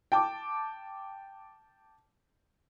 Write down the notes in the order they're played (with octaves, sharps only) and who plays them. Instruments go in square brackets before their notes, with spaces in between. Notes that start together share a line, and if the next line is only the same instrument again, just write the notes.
[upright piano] G5 A5 D6